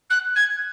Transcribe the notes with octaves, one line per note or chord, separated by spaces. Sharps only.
F#6
G#6